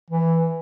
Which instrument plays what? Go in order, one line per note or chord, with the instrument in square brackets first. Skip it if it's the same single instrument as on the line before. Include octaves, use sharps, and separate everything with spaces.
[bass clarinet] E3